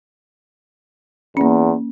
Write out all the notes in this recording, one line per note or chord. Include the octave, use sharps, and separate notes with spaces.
E2 A#3 C#4